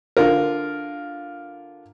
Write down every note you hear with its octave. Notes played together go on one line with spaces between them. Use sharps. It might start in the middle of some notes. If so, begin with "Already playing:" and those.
D3 F4 A#4